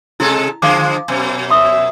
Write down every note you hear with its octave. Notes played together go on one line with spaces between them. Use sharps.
C3 G#3 E4 A4
D3 F3 G#3 F5 D6
F#2 B2
E5 C6 D#6